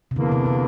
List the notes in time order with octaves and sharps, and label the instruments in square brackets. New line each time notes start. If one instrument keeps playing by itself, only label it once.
[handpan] C3
[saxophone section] E2 E3 A#3 D4 [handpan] D3
[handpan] C3
C3